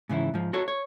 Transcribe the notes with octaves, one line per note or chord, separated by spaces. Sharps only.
G#2 C#3 E3 E4
G#2 F3
F#4 A4 C#5
C#5